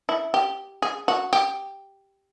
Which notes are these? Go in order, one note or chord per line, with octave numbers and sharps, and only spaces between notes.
E4
G4
G#4
F#4
G4